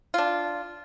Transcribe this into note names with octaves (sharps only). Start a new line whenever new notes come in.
D4 F4